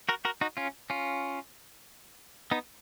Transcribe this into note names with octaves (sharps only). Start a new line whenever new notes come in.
F#4 A#4
F#4 A#4
D#4 F#4
C#4 F4
C#4 F4
B3 D#4